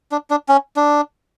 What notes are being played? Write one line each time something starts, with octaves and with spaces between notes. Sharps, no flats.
D4
D4
C#4
D4